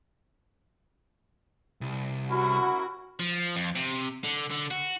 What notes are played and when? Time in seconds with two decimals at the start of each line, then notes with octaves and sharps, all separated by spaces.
1.81 C2
2.30 C#4 E4 F#4 A#4 B5
3.20 F3
3.56 F2
3.75 C3
4.24 D3
4.50 D3
4.71 F#4